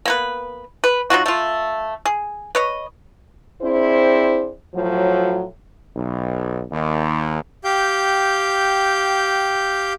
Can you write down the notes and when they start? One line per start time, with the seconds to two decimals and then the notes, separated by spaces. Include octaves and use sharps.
0.05 A#3 B3 B4
0.84 B4
1.10 F#3 D#4 F4 F#4
1.26 A3 F4
2.05 G#4
2.55 B4 C#5 D#5
3.62 C4 D4 E4 G#4 C5
4.75 A2 F3 F#3
5.95 B1
6.72 D#2
7.64 G4 F5 G5 G6